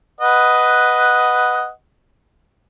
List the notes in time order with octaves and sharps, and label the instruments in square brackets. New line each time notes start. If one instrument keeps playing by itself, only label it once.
[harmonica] B4 D#5 F#5